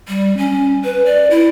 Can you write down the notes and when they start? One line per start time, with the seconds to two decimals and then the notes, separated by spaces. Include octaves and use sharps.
0.08 G3
0.37 C#4
0.84 B4
1.05 D5
1.31 E4